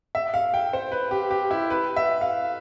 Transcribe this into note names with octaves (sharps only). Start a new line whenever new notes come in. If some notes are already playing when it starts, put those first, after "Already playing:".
E5
F5
G5
C5
B4
G4
G4
E4
B4
E5
F5